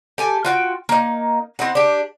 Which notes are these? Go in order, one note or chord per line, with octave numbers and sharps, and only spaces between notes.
G4 A4 G#5
F4 F#4 G5
A#3 D#4
C4 D#4 E4 F#5
D4 G4